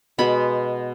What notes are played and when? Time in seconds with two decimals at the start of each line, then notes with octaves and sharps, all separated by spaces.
0.18 B2 G#3 B3 B5